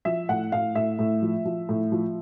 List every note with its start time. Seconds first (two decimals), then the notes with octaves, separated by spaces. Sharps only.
0.05 F3 E5
0.29 A2 F#5
0.52 A2 F5
0.75 A2 E5
0.99 A2
1.22 F3
1.45 F3
1.69 A2
1.92 F3